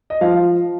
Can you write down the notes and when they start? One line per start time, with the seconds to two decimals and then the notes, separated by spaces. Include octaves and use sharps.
0.10 D#5
0.21 F3 F5